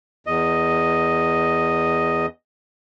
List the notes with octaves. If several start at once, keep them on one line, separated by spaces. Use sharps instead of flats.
E2 D#5